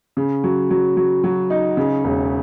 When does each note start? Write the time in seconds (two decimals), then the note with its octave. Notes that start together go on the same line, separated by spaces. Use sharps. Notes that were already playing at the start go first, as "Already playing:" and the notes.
0.17 C#3
0.44 F#3
0.70 F#3
0.97 F#3
1.24 F#3
1.50 D#4
1.77 C#3
2.04 E1